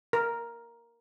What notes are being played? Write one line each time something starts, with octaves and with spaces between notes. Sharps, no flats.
A#4